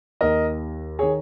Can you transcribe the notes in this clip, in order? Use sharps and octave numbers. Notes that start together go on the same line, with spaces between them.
D#2 D#3 A#4 D#5
D#3 G#4 C#5